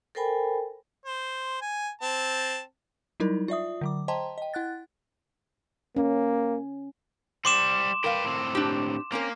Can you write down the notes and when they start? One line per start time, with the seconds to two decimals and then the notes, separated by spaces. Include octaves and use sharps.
0.15 A4 A#4 C5 G5 G#5 B5
1.06 C5
1.62 G#5
2.02 C4 A5
3.20 F#3 G3 D#4 E4 A#4
3.48 F4 D5 E5 D#6
3.81 D3 F#3 D6
4.08 C5 D#5 G5 A5 A#5 C6
4.38 D#5 G5
4.54 E4 F#5 F#6 A6
5.96 A#3 C#4
7.45 G3 C5 C6 D6 E7
8.04 A#4 B4 F5 G5
8.24 A2 C4
8.55 D4 G4
9.12 A#3 C4 C#4 A#4